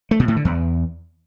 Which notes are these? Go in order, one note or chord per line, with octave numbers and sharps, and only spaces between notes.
A3
B2
A2
D3
E2